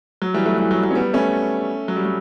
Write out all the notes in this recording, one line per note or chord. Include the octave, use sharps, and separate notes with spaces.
F#3
E3 G3
F#3 A3
E3 G3
F#3
F#3
C#4
G3 B3
A3 C#4
F#3
G3
F#3